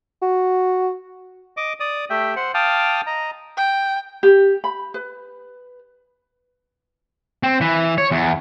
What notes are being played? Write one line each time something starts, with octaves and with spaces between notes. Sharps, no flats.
F#4
D#5 D6
D5 D#6
A3 G4 E5 G5
C5 F#5
F5 G5 A5 D6 D#6 F6
D#5 A#5
G5
G4
B5
B4
C4
E3
C#5
E2